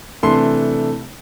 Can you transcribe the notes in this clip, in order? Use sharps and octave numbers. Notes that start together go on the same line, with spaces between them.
C3 E3 A3 D4 C6